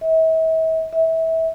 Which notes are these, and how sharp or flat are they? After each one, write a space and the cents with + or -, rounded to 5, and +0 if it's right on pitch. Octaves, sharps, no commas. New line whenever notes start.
E5 -40
E5 -25